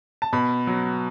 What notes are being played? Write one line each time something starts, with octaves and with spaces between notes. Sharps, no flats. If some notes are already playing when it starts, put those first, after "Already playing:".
A5
B2 B5
F#3